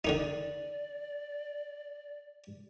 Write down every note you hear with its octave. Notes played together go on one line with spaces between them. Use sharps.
D3 D#3 D#4 D5